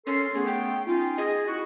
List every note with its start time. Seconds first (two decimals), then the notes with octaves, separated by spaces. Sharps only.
0.07 C#4 A4 A#4 C6
0.35 A3 B3 G#4
0.46 G5
0.86 C#4 D#4 F4
1.18 G#4 D#5
1.47 E4 F#4